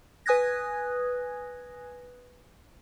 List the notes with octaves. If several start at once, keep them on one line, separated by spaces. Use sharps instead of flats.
B4 G#5 D#6 F#6 G#6 A#6